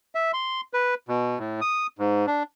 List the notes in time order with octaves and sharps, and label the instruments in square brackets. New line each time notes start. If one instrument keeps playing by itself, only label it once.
[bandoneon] E5
C6
B4
B2
A2
D#6
G#2
D4